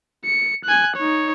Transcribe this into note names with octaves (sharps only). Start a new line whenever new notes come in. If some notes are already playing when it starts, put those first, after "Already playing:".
C#7
G#5 F#6
D#4 C#5